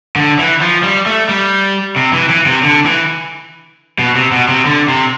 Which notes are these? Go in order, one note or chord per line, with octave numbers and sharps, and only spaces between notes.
D3
E3
F3
G3
A3
G3
C3
E3
E3
C3
D3
E3
B2
C3
B2
C3
D3
C3